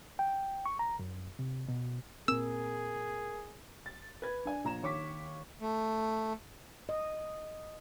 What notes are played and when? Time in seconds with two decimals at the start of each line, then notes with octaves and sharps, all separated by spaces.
0.19 G5
0.66 C#6
0.79 A#5
0.99 F#2
1.39 C3
1.68 B2
2.28 A#2 C4 G#4 A#4 E6
3.86 A6
4.22 B4 G#6
4.45 D4 G#5
4.64 A#1 A#5 E7
4.83 D#2 C#5 C#6 D6 B6
5.61 A3
6.89 D#5